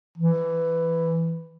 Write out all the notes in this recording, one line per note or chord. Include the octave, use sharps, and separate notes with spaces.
E3